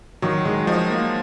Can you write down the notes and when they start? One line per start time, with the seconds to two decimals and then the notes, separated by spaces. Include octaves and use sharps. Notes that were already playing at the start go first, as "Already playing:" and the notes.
0.22 D#3 F#3
0.45 D#3 G#3
0.67 F3 D#4
0.89 A#3